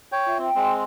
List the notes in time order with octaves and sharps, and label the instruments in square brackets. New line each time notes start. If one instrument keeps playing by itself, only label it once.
[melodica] C#5 G5
[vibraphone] F4 E5
[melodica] C4 [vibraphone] G5
[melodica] G#3 C4